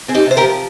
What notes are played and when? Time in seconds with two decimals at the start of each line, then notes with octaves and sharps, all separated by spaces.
0.08 C4 G#4
0.15 D#4 G4
0.26 C3 C5
0.37 G4 A#4
0.44 F3